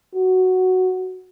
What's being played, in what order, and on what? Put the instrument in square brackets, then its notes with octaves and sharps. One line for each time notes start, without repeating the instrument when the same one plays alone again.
[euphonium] F#4